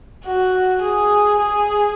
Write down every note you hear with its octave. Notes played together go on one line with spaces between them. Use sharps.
F#4
G#4
G#4